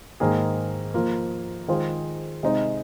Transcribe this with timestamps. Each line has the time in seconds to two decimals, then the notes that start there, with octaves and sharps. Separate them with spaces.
0.20 G#2 D#3 A#3 G#4
0.94 F3 A#3 F4
1.68 D#3 G#3 F4 G#4 C5
2.43 C3 G#3 D#4 C5